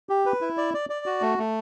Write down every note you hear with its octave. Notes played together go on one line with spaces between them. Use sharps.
G4
B4
E4
D5
D5
D5
F#4
A3
A3